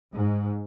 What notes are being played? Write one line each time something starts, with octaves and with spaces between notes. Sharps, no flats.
G#2